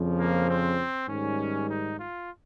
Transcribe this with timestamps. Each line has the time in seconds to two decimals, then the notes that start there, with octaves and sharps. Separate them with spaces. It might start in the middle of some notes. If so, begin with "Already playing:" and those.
Already playing: F2 C#3 F3
0.17 A#3
0.48 C4
1.08 G#2 D#3 G3 C#4
1.69 D#4
1.99 F4